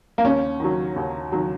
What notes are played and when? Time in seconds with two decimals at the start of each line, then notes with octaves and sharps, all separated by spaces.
0.18 A#3
0.24 D#2 C#4
0.60 D#3 F#3
0.96 D#2
1.32 D#3 F#3